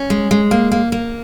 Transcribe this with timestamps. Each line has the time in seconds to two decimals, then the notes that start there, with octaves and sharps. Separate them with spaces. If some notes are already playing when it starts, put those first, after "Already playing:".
Already playing: C#4
0.10 G#3
0.31 G#3
0.51 A#3
0.72 A#3
0.92 A#3